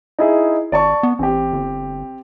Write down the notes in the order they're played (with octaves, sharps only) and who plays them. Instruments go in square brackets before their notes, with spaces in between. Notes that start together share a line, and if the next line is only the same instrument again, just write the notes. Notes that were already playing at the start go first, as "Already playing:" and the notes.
[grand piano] D#4 E4 G#4
[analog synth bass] G#1 [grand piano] D5 A5 C#6
[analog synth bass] B3
[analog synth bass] A1 [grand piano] C4 G4
[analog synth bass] G1